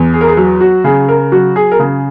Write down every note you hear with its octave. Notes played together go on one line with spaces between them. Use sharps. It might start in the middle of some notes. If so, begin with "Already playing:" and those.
Already playing: E2
G#4
A#4
G#4
F#3
F#4
C#3 G#4
A#4
F#3 F#4
G#4
A#4
C#3 G#4